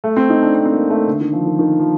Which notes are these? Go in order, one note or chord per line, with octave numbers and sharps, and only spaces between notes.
A3
C4
D#4
D4
C4
C4
A#3
A3
D3
D#3
F3
D#3
D#3
F3